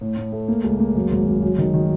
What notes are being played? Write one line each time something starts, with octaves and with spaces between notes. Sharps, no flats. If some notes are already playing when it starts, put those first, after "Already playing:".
A2
A2
A3
A#3
C#2
A#3
F#2
G#1
G#1
F#2
D#3
D#3